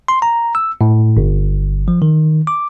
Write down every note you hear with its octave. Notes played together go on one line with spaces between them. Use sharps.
C6
A#5
E6
A2
G1
F3
D#3
D6